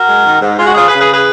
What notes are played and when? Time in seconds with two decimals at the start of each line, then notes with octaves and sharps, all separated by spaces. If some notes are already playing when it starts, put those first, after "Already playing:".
Already playing: F#4 A#4
0.08 G#3
0.24 D#3
0.41 G#2
0.59 G#3 F4
0.67 F#4
0.75 C#3 F4 G#4
0.88 G#4 B4
0.93 C#3
1.01 G#4 B4
1.13 G#4 B4